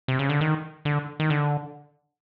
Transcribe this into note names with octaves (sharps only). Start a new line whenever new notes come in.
C3
C#3
D3
D#3
D3
D#3
D3